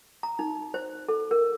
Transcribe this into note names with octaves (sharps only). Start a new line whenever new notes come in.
A#5
D#4
C5
A4
A#4